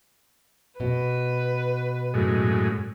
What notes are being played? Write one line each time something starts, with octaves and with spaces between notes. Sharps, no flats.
B2 B4
F#2 A2 G#3